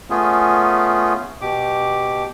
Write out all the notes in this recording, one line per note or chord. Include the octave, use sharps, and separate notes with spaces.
A3 B3 C#4 F4 G#4
B2 G4 D6